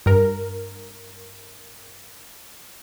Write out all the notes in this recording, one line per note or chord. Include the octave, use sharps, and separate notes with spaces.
G2 A#4